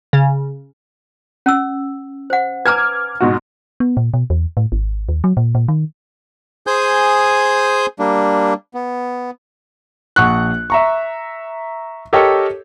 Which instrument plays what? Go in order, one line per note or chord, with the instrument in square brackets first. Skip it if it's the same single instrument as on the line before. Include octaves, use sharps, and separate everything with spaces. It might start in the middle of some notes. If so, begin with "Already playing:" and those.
[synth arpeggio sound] C#3
[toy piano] C#4 E6
C5 F#5
[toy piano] B4 G#5 A#5 [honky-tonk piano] D6 F6 G#6
[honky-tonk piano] G#2 B2 F#4
[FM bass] B3
A#2
B2
E2
A2
G#1
D#2
F#3
A#2
A#2
D#3
[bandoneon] G#4 C5 G#5 D#6 G6
G3 A#3 D4
B3
[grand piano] A#1 F#5 C#6 F#6
E5 A#5 C#6
G4 A4 A#4 C#5 D#5 G5